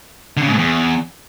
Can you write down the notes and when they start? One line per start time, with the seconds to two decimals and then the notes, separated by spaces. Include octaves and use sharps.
0.37 D3
0.42 C#3
0.48 G#2
0.53 A2
0.59 E2